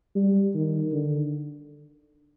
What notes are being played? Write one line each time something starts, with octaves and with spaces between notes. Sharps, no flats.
G3
D#3
D3